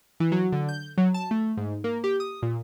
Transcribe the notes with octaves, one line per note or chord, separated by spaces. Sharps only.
E3
F#3
D3
G6
F#3
A5
A3
G#2
A#3
G4
D#6
A#2